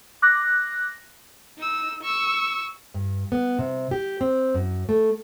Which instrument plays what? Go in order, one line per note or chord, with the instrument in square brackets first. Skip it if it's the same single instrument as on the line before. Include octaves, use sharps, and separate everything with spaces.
[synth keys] D6 F#6 A#6
[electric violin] D#4 E6
C#6 E6
[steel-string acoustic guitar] G2
B3
C3
G4
C4
F#2
A3